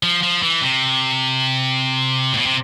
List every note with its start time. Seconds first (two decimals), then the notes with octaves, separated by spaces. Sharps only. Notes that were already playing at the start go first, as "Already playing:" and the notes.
0.03 F3
0.23 F3
0.43 E3
0.62 C3
2.33 A2
2.36 B2
2.46 C3